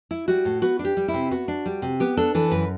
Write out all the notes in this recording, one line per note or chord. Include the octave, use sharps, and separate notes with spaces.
E4
G3 F#4
A2
B3 F#4
D4
G4
G3
E4
C3
B3 F#4
D4
G3
C3
B3 G4
D4 A4
E3 A4
F#2 B4